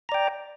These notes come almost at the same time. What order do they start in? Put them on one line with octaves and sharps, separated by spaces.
A#5 D5 G5